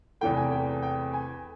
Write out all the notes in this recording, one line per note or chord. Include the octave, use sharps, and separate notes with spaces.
E2 C3 E3 A3 G5
G#5
G5
G5
G#5